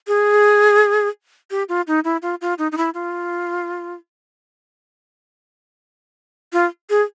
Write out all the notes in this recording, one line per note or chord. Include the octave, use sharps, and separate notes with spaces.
G#4
G4
F4
D#4
E4
F4
F4
D#4
D#4
E4
F4
F4
G#4